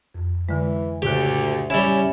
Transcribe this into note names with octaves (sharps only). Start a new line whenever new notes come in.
F2
D3 E3 G#3
D2 A2 C#3 G4 F#6
G3 C#4 E4